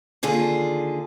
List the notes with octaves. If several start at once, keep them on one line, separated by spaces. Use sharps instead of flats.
D#2 D3 F4 G#4